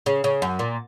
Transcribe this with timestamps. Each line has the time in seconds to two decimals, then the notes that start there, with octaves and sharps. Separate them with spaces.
0.06 C#3
0.24 C#3
0.42 F#2
0.59 A#2